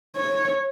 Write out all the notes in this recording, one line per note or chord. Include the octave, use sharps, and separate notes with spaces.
C#5